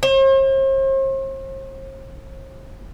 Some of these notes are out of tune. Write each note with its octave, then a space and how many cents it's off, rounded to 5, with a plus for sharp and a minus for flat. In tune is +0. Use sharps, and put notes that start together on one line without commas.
C5 +45